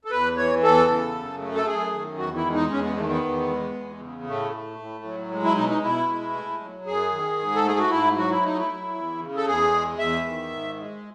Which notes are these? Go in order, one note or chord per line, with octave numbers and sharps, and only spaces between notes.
A4
E2 B4
E3 C#5
E2 A4
C#3
F#2
A3
A4
F#2 G#4
D#3
E2 F#4
E4
G#3
D#4
E2 C#4
B3
D#3 A3
B3
E2
G#3
E2
C#3
A2 A3
A3
A2
F#3
G#3
E4
B2 D#4
D#4
B2 E4
G#3
A3
F#3
F#2 G#4
D#3
G#2
A4
A3 G#4
F#4
G#2 E4
F#3 F#4
E4
A3 D#4
E4
F#3
E2
C#3
A4
E2 G#4
G#3
E2 E5
D#3
G#2
G#3